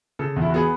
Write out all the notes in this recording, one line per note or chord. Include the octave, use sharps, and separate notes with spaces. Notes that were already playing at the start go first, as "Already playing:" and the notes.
C#3 A4
E2
E4
F#4
B3 G#4